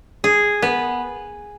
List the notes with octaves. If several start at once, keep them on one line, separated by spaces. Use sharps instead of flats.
G#4
B3